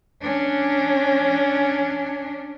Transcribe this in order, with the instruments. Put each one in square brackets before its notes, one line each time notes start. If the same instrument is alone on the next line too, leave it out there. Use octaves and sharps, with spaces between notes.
[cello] C#4 D4